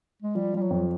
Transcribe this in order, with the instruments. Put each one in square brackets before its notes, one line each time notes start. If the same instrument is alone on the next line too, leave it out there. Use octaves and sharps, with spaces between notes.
[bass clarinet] G#3
[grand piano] F3 [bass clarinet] G3
[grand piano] F3 [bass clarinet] G3
[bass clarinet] F#3
[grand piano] F2